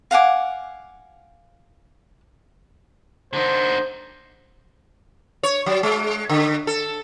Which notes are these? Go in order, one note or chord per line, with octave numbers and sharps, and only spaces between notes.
F5 F#5 G#5 D6
D3 D#4 C5
C#5
F#3
G#3
D3
A4